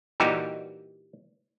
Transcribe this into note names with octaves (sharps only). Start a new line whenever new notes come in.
A#2 E3 G3 D#4 F#4 G4